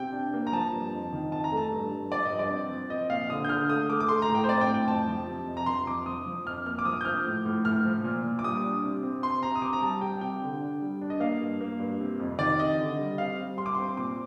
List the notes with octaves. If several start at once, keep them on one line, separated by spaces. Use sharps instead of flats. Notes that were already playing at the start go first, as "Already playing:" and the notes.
Already playing: C3 G5
D4
A#3
A#5
F3 A5
G2
F2
D#3
F2 A5
A#5
A3 A5
G2
G2
F3 D5
D#5
G2
D5
C4
F3
C4 D#5
A#2 F5
D3 D#6
G6
D3 F6
A3 D#6
A3 D6
D6
A3 C6
A#5
A2
G5
C5
C4 D5
G5
A2
G5
F2 A5
F3
C3
F2
A#5
F3 C6
F2 D6
F3 D#6
F3
F2 F6
A#3 F6
D6
F3 D#6
G6
F3 F6
A2
A2
A2 F6
F3
A#2
A#2
D6
G3 D#6
D4
C3
C4
C3 C6
C4 A#5
D#6
C3 D6
A#5
G3 A5
G3 G5
C3 G5
D3
D4
G3
D4
D#5
A#3 F5
G2
A#3
G2
C3
F2
D#3 D5
C3 D#5
D3
G3
C4 F5
G3
G3 C6
D6
C4 C6
A#2 D6